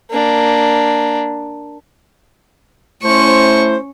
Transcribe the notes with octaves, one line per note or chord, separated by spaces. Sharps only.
A#3 D4
A3 C#4 E4 C5 C#6